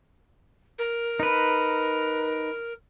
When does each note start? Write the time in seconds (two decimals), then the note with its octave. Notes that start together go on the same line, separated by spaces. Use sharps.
0.78 A#4
1.20 D#4 B4